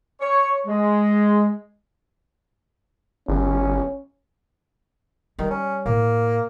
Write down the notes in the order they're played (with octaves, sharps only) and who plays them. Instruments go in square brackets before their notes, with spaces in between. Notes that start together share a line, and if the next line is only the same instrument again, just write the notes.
[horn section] C#5
G#3
[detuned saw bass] G1 [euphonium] C#4
[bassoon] D#3 [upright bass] G3
[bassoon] C#4
[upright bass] A2 [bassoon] A#3